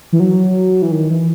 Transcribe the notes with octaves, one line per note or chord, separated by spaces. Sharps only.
E3
F#3
E3
D#3
E3